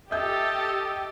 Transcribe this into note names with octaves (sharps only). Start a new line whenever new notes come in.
G4 A4 D#5 E5 G6